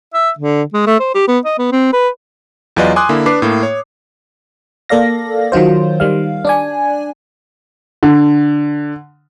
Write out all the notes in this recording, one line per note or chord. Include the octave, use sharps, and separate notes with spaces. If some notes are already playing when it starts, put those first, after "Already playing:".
E5
D3
G#3
A3
C5
G4
B3
D#5
B3
C4
B4
E2 F#3 F4 B4 D5 D#5
G#5 C6 D6 D#6 F#6
D3 A#3 E4
D4 B4 D6 C7
A2 A#3
C#5
A#3 A4 D5 F5 A#6
D#3 F#3 F4 C5
D#3 G3 F5
D4 D5 G#5
D3